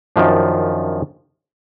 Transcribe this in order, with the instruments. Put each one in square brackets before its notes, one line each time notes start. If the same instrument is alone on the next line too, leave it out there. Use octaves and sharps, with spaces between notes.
[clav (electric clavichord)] F#2 D#3 F3 D4